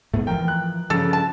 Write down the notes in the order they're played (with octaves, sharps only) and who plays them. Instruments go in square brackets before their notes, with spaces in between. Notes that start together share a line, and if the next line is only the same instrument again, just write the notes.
[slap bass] G#2 A3 B3
[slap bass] E3 F3 [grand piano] A#4 G5
[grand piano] F#6
[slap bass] G2 F3 [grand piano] C#3 [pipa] A4
[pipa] A5